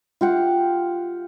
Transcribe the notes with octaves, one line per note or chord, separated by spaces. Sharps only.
F4 G4 F#5